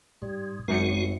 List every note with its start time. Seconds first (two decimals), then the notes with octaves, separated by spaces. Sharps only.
0.22 G#2 G3
0.68 G#1 F#2 G#3 F#4 C#7